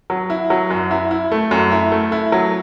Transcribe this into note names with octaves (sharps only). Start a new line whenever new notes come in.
F#3
E4
F#3
F#2
E4
E4
A3
F#2
E4
A3
E4
F#3